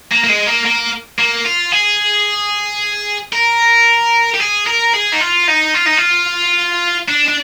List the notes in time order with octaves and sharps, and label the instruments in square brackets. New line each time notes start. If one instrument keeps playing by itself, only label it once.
[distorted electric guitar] A#3
A#3
G#3
A#3
A#3
A#3
F4
G#4
A#4
G4
G#4
A#4
G#4
D#4
F4
D#4
F4
D#4
F4
D4
D4